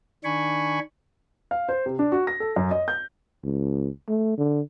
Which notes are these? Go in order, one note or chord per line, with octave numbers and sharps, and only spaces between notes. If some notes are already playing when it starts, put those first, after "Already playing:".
D#3 D4 G#5 B5 C#6
F5
C5
C3
D4
F#4
A#6
A4
F#2
D#5
G6
C#2
A3
D3